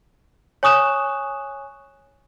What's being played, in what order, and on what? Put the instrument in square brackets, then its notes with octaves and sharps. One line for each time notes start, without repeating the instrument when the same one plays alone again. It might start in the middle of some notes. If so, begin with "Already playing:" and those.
[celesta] C#5 G#5 C#6 D#6 F#6 E7